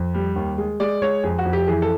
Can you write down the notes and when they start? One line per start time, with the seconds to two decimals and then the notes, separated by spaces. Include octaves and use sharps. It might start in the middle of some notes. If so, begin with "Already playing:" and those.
Already playing: F2
0.14 G3
0.36 D#2
0.58 G#3
0.80 G#3 D5
1.02 G#3 C#5
1.23 F2 G#4
1.38 F#4
1.45 F2
1.53 G4
1.67 E3 G#4
1.82 A4